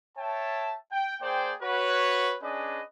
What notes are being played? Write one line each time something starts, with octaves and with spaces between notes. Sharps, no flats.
C#5 E5 G5 A5
G5
A#3 G#4 C5 D5 G5
F#4 B4 C#5
C#4 D4 G#4 B4 D5 D#5